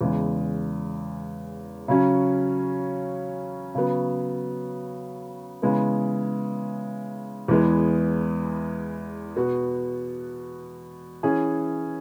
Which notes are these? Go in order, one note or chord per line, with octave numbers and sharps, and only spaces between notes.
E2 C#3 G#3
C#3 F#3 C#4
C#3 F#3 B3
C#3 E3 G#3 B3
E2 E3 G#3 B3
B2 B3 F#4
E3 C#4 G#4